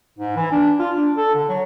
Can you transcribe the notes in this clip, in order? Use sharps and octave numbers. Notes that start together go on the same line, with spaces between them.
G#2
E3
D4
F4
D4
A4
D3
F#3